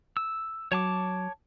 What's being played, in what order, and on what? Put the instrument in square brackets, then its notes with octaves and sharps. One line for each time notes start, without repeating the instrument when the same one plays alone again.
[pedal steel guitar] E6
[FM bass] F#3 [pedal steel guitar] C#5 A5 D6